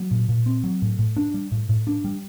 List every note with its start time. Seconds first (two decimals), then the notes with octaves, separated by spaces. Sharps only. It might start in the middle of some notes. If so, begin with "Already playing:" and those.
Already playing: F#3
0.11 A#2
0.29 A#2
0.46 C4
0.64 F#3
0.82 A2
0.99 A2
1.17 D4
1.34 G3
1.52 A2
1.69 A2
1.87 D4
2.04 G3